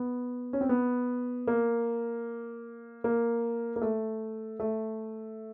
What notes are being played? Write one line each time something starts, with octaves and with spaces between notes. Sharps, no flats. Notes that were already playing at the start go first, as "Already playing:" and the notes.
Already playing: B3
C#4
C4
B3
A#3
A#3
A#3
A3
A3